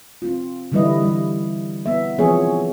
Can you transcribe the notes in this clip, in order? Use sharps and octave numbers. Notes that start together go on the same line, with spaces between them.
C4 F4
D3 E3 G3 E4 B4 D#5
E3 G3
B3 E5
E3 F3 B3 C4 G#4 C#5